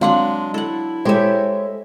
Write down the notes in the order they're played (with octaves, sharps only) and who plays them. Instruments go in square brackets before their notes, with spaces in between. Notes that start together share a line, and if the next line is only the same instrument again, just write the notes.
[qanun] F#3 D4 F#5 [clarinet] G#3 [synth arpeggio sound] C4 F5 C6
[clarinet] E4 [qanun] A4 F#5
[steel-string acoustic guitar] G#3 A4 C#5 [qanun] G4 E5 [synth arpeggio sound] C5